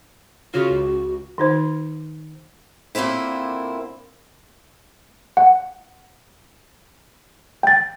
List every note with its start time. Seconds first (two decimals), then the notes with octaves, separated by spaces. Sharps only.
0.54 C#3 C#4 F4 F#4
0.70 C#2
1.38 D#3 D#4 C5
2.95 A#2 D3 A#3 C4 E4
5.37 F#5
7.63 G5 A6